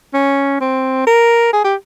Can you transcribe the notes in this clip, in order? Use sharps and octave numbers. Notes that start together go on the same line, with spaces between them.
C#4
C4
A#4
G#4
G4